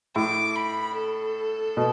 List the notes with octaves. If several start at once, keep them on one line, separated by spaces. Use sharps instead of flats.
A2 D6
B5
A4
B2